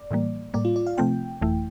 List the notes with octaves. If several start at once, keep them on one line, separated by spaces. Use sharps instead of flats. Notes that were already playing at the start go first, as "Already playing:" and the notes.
Already playing: D5
A2 E3 G3 A#3
A2 G3 A#3 D5
F4
D5
F5
C3 F3 A3 C4 F4 G5
G1 F2 E3 A3 E4